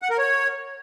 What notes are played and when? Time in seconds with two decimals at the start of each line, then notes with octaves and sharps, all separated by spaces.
0.02 F#5
0.10 A#4
0.18 C#5